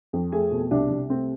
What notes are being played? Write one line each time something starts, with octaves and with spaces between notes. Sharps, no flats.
F2
A3 G#4
B2
C2 D4
C2
A3 C4